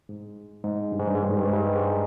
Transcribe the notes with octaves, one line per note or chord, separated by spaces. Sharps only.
G#2
G#2
G2
G#2
G2
G#2
G2
G#2
G2
G#2
G2
G#2